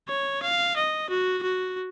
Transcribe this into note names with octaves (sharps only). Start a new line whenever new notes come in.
C#5
F5
D#5
F#4
F#4